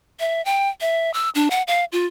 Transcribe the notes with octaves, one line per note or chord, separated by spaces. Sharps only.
E5
G5
E5
E6
D4
F#5
F5
F4